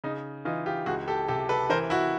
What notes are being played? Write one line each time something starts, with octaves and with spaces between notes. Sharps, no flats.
C#3 D#4
E3 D#4 F4
F4 G4
C#2 F#4 G#4
G4 A4
C3 G4 A4
A4 B4
E3 A#4 C5
E4 F#4